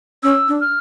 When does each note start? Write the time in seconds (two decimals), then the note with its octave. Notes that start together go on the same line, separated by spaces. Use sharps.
0.23 C#4 E6
0.48 D4
0.61 F6